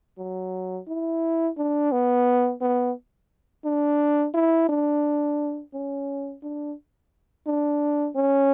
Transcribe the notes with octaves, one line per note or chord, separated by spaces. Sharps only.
F#3
E4
D4
B3
B3
D4
E4
D4
C#4
D4
D4
C#4